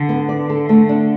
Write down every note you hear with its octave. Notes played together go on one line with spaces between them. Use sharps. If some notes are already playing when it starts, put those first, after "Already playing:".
Already playing: D3
B3
D5
A4
A3
D4